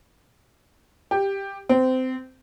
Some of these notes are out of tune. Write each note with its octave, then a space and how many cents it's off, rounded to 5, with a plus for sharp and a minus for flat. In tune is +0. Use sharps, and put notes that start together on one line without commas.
G4 +5
C4 -20